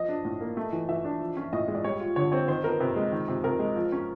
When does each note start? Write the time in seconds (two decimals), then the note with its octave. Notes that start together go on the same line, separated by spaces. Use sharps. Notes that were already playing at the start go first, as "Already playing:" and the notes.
Already playing: F3 D#5
0.09 D4
0.25 A2
0.41 A#3
0.57 A3
0.72 E3
0.89 E3 E5
1.05 D4
1.21 F3
1.37 C#4
1.53 A2 D#5
1.68 G#3
1.75 D5
1.84 G3 C#5
2.00 F4
2.16 D3 C#5
2.32 C4 C#5
2.48 D#3 C5
2.64 B3 A#4
2.80 C3 B4
2.96 G#3
3.12 D#3
3.28 C3
3.44 C3 A#4
3.59 G#3
3.76 F3
3.92 C#4